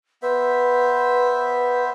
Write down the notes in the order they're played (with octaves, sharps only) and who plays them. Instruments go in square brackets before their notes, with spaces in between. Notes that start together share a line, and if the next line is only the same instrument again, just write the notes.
[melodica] B3 C5 E5 [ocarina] B4